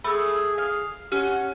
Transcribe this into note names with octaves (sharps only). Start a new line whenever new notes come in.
A3 G#4 B5 E6
F5
C#4 G4 F#5